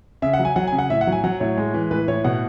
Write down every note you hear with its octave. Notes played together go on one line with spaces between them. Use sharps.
C#3 E5
F#5
F#3
G#5
F#3 F#5
G#5
C#3
F#5
A2 E5
F#5
F#3
G#5
F#3 F#5
A2 C#5
G#3
E3
A2 B4
A2 C#5
B2 F#5